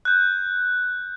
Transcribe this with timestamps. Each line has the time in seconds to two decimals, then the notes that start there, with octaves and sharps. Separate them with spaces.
0.05 F#6 G6